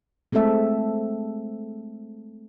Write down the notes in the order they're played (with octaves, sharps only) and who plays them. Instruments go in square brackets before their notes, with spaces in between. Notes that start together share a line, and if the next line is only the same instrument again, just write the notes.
[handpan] G#3 A3 C4 A4 E5